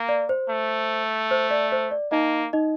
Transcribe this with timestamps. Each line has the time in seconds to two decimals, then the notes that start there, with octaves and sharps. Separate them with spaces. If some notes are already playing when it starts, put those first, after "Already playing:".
Already playing: A#3
0.09 D5
0.29 C5
0.49 A3
1.31 C5
1.51 D5
1.72 C5
1.91 D5
2.12 A#3 D#4 D#5
2.53 D#4 D#5